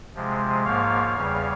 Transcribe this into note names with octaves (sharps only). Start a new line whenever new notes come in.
C3 F3 G#3
G#2 F3 A#3 C#5 F5
E2 C#3 G3